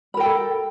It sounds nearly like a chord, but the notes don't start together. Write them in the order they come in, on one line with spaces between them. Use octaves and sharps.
B5 A#4 G5 A4